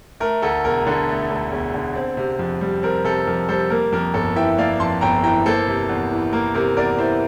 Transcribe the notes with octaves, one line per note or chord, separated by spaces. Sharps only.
A3 A#4
D2 A4
E1 A#4
D3 A4
A3
D2
E1
D3
C4
C3
F2
G3
C4 A#4
C3 A4
F2 A#4
G3 A4 C5
A#3 A#4
F2 A#4
G1 A4
E3 E5 G5
A#3 D5 F5
F2 A5 C6
G1 G5 A#5
E3 G5 A#5
A#3 A4 C5
C3
E2
E3
A#3 A#4
C3 A#4
E2 A#4 D5
E3 C5 E5